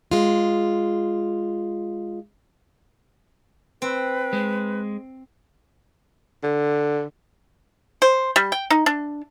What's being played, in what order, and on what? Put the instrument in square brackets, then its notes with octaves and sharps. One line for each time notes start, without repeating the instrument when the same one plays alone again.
[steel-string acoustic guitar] G#3 F4
[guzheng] C4 [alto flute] B4
[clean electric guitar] G#3
[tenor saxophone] D3
[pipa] C5
G3
G5
D#4
D4